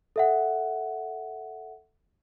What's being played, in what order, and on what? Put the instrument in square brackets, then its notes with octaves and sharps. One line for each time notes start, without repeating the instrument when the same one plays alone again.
[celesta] A4 E5 F#5